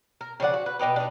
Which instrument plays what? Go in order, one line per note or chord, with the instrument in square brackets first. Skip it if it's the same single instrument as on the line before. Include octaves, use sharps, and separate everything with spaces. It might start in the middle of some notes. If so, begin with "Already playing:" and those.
[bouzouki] A#4
C#3 F3 D5 F#5
F#4
B4
B2 D#4 G4 B4
D4 D#4